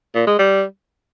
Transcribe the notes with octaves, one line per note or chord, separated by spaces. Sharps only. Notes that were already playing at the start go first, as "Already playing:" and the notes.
A#2
G#3
G3